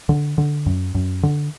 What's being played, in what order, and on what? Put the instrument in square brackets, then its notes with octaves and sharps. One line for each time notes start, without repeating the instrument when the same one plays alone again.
[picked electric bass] D3
D3
F#2
F#2
D3